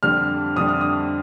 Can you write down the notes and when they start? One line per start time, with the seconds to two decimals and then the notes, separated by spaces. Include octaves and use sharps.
0.03 F2 D3 G3 F6
0.56 F2 D3 G3 D#6
0.69 F6
0.81 D#6